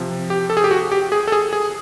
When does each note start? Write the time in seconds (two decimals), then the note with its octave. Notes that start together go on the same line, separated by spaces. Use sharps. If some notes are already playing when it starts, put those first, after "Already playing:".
Already playing: C3 F3
0.30 G4
0.50 A4
0.57 G#4
0.64 G4
0.71 F#4
0.92 G4
1.12 G#4
1.28 A4
1.32 G#4
1.53 G#4